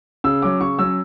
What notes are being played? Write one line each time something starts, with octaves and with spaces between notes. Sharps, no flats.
C#3 E6
F#3 C#4 D6
C#3 C#6
F#3 C#4 E6